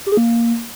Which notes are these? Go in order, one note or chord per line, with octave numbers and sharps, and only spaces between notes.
G4
G#4
A#3